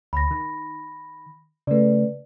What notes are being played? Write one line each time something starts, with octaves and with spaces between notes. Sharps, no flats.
D2 B5 A#6
D#3
C#3 A3 B4 D5